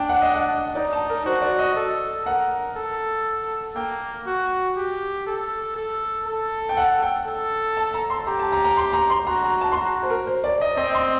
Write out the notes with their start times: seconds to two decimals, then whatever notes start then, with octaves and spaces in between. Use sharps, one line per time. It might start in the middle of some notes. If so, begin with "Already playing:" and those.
Already playing: D4 G5 A5
0.09 F#5
0.22 D#5
0.34 F#5
0.75 D#4 D5
0.93 A5
1.10 A#4
1.26 F#4 C5
1.42 D5
1.59 D#5
1.76 A4
2.26 A#4 F#5
2.76 A4
3.76 A#3 G5
4.26 F#4
4.77 G4
5.27 A4
5.76 A4
6.26 A4
6.69 G5
6.77 F#5
7.02 G5
7.27 A4
7.77 A5
7.94 A#5
8.10 C6
8.27 G4 A#5
8.39 A5
8.52 A#5
8.64 A#5
8.77 C6
8.93 A#5
9.10 C6
9.27 F#4 A#5
9.44 A#5
9.61 A5
9.72 C6
9.77 F#4 A#5
10.03 C5
10.10 A#4
10.27 C5
10.44 D5
10.61 D#5
10.77 C4 D#5
10.94 C6